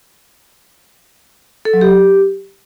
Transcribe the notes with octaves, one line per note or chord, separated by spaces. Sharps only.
A4
F#3
G4